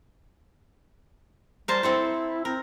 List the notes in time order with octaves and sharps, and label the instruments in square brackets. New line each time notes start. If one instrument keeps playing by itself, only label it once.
[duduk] G3 [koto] A#4 C5 A5
[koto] C4 A4 C5 [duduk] E4
[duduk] C4 [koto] A#4